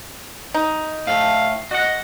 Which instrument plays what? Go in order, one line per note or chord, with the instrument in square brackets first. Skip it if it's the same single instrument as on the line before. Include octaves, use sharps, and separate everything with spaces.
[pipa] D#4
[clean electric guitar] A2 A3 [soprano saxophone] F5
[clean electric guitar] F#4 F#5 [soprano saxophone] D#5